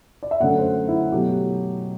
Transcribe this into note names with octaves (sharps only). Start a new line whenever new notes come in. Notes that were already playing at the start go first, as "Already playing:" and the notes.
D5
E5
F#2 D3 A3 F#5
C5
E4
B2 F#3 A3 G4